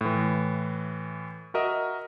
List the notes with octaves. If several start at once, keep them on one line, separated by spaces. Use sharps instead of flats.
A2 E3
F#4 A#4 D#5 E5